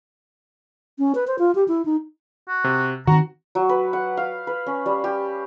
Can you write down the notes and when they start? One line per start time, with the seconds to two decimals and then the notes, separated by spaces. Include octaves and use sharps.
0.99 C#4
1.15 B4
1.27 C5
1.39 F4
1.55 G4
1.68 E4
1.85 D#4
2.48 F#4
2.64 C3
3.07 D#3 C4 F#4 A#5
3.55 F#3
3.69 B4
3.93 F#5
4.17 F5
4.47 B4
4.66 C#4
4.86 G3
5.04 G4